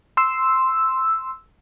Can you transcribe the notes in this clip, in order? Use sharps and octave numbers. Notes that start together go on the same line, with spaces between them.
C6 E6